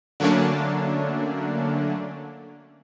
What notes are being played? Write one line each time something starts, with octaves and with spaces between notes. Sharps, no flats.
D3 F#3 A3 A#3 C#4 D4